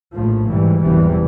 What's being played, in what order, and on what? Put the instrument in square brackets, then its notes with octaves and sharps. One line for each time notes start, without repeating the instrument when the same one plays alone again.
[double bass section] A#1 A2 F3
G#2 E3 G3
F#1 E2 C3 E3 G3